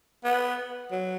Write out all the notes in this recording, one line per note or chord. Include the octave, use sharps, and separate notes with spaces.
B3
F#3